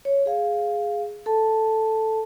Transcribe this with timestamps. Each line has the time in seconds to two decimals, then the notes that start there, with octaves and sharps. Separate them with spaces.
0.05 C#5
0.26 G#4 F5
1.26 A4 A5